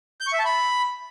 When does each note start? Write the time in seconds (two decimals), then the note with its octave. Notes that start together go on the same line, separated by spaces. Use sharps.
0.21 G6
0.27 C#6
0.33 E5
0.39 A5
0.45 B5